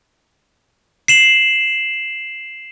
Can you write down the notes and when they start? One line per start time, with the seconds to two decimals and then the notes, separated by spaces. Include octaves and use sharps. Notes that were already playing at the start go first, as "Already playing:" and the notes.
1.08 C7 E7 F#7